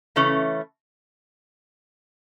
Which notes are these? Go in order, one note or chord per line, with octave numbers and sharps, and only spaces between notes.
C#3 E3 A3 C#4